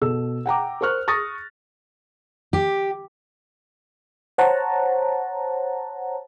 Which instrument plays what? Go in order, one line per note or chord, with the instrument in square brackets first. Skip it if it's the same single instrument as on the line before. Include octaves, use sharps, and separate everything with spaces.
[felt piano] B2 A4 E6
F#5 G5 A#5 D6
A#4 C5 C#6 F6 F#6
C#6 D#6 A6 A#6
[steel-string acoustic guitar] G4
[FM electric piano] C5 C#5 F#5 A5 A#5